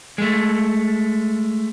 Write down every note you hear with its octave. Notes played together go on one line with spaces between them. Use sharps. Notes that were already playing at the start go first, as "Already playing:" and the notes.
G#3 A3